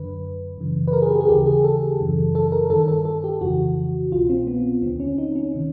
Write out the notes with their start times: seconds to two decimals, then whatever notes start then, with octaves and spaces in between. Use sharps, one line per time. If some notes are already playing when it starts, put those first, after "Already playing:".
Already playing: F#2 D3 B4
0.58 F#2 C#3 E3
0.87 B4
0.93 A#4
1.02 G#4
1.10 G4
1.20 G#4
1.28 D#2 C#3 E3 G4
1.46 G#4
1.64 A4
1.99 F#2 C#3 E3
2.35 A4
2.52 A#4
2.70 G2 D#3 A4
2.88 A4
3.05 A4
3.24 G4
3.41 F2 C#3 E3 F#4
4.12 C2 B2 F4
4.29 C4
4.47 B3
4.82 D#2 D3 C4
5.00 C#4
5.18 D#4
5.35 C#4
5.55 C3 D#3